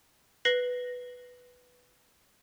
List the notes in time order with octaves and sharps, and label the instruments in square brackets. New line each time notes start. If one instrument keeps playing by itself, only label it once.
[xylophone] B4 A#6 C7 F#7